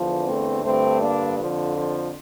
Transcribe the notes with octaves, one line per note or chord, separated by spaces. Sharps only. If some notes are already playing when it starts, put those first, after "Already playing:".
Already playing: E2 D3 F3
A3 C4
G2 D3 A3 C4
A#3 D4
F2 D3 F3
F3